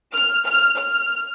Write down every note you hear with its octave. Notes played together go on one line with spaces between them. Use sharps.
F6
F6
F6